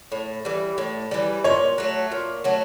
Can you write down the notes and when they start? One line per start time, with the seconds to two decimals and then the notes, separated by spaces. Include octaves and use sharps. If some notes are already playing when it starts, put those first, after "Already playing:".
0.12 A2
0.45 E3 G3
0.78 A2
1.11 E3 G3
1.44 A#2 C#5
1.78 F#3 A3
2.12 A#2
2.44 F#3 A3